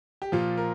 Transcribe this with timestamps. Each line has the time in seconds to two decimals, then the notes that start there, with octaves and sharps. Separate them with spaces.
0.22 G4
0.32 A#2 F3 F4
0.57 A#4